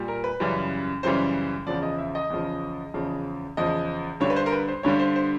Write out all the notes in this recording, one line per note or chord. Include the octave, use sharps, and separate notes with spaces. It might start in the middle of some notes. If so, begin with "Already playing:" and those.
Already playing: A#2 G3
A#4
B4
F#2 C#3 E3 G3
F#2 C#3 E3 G3 C5
E2 C#3 F3 D5
D#5
E5
D#5
E2 C#3 F3
E2 C#3 F3
E2 C#3 F3 D#5
G2 D3 G3 C#5
B4
C5
A#4
B4
C5
G2 D3 G3 C#5
C5
C5